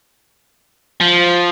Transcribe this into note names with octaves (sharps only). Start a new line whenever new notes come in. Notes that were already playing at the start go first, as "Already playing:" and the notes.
F3